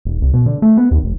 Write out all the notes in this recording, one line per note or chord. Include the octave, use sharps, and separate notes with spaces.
D#1
C2
B2
D3
A3
B3
D#2
F1